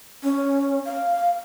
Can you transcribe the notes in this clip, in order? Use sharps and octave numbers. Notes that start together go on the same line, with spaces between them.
C#4
F5